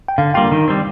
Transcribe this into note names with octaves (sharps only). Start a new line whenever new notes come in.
G5
D3 F5
G3 A#3 F4 G5
D#3
G3 C4